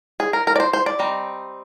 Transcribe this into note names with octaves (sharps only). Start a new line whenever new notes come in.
G#4
A#4
A#4
D5
C5
C5
D5
G3 C4 D#4